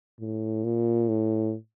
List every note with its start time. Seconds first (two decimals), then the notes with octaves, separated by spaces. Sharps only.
0.20 A2
0.64 A#2
1.09 A2